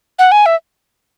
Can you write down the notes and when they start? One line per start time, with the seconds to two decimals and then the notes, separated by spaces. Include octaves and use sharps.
0.19 F#5
0.32 G#5
0.46 E5